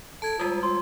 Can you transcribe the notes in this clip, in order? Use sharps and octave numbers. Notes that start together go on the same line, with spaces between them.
A4 A5 G#6 D7
G3 G#3 F4
F4 C6